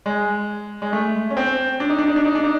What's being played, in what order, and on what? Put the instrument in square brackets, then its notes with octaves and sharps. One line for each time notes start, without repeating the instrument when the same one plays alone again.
[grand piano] G#3
G#3
A3
C#4
C4
D4
D#4
D4
D#4
D4
D#4
D4
D#4